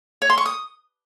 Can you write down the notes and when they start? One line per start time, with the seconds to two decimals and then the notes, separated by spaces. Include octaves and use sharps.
0.22 C#5
0.30 C6
0.38 C#6
0.46 D#6